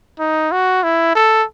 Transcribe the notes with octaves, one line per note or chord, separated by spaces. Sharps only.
D#4
F#4
E4
A4